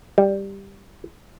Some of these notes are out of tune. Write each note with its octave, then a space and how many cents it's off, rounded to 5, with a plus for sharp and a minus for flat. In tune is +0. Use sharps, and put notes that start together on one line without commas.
G3 +5